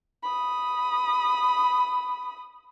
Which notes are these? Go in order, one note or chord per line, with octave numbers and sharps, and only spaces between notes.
B5 D#6